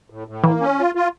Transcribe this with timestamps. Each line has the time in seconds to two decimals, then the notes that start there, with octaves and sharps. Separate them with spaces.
0.10 A2
0.28 A2
0.44 E3 A#3
0.61 C#4
0.79 F4
0.95 F4